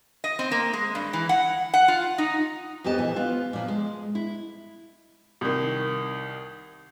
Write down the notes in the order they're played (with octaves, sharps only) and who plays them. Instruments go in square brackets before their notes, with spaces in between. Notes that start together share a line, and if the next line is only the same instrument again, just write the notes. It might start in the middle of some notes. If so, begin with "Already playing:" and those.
[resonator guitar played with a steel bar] D#5
C4
A#3
G#3
G2
E3
F#5
F#5
F4
D#4
[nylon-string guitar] F2 B3 G4 D#5 A5
A#2 E3
B3 F4
A#2 F3
G#3
E4
[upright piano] C2 D#3